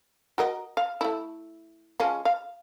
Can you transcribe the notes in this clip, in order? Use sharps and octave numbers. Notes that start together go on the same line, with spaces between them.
F#4 A#4 D#5
F5
A3 E4
F3 G#3 C#4
F5